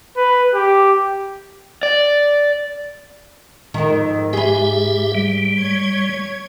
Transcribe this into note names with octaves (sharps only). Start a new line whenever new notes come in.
B4
G4
D5
F2 G#2 D#3
G4 G#4 B4 E5
G3
C#5 G#6